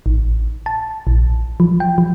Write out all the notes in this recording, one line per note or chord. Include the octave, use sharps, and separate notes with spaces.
A1
A5
A#1
F3
G5
F3